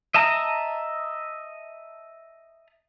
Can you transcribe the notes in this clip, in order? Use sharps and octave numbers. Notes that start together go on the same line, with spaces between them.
D#5 E5 A5 A#5